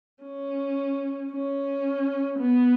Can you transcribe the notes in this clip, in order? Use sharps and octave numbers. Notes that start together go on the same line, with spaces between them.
C#4
C#4
B3